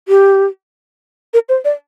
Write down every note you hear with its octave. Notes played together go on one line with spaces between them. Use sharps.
G4
A#4
C5
D5